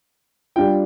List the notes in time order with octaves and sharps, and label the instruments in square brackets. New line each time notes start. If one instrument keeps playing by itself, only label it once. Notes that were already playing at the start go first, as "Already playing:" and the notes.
[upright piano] G3 D4 F4 G5